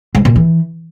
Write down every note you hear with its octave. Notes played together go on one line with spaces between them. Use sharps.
G#2
A#2
E3